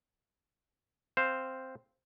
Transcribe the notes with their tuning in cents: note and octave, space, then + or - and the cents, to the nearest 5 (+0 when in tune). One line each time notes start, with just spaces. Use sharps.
C4 +0 C5 +0 F5 +0